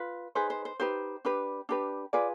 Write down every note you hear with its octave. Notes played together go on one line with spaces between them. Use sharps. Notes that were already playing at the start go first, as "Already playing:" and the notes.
Already playing: F4 B4
D#4 G#4 B4 C5
C5
C5
D#4 G4 B4 C5
D4 G4 B4
D4 G4 B4
F4 G#4 B4 D5